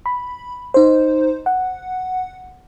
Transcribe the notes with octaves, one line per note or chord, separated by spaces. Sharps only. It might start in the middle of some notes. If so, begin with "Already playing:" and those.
B5
D#4 C5
F#5